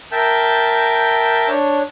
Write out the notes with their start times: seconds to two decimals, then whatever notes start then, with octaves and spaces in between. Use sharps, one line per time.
0.12 A#4 E5 G5 A5 G6
1.48 D4 C#5